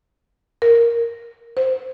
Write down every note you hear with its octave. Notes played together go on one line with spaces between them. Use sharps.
A#4
C5